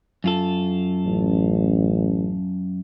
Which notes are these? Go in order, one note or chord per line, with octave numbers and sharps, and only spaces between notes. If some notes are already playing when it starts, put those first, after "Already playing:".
F#2 F4 A4
A1